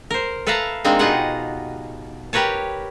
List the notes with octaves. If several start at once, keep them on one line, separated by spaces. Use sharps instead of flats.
A#4 C5
A4 B4 E5 F5 A5 A#5
G#3 A#3 C4 D4 D#4
B2 D#4 F4 G4 G#4 F#5
G4 A#4 B4 C#5 A5